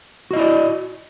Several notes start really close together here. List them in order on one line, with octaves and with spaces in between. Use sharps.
F#4 D#5 E4 D5